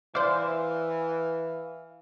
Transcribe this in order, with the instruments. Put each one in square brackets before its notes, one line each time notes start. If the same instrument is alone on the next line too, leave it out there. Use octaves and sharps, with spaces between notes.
[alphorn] E3 [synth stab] C5 D5 [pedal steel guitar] E5 F5